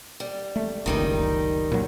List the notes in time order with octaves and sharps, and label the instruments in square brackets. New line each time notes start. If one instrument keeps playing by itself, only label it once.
[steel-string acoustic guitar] G3
[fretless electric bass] A3
[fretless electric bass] F#1 C#2 [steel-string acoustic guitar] D#3 G3 D#4
[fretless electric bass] A#2 F#3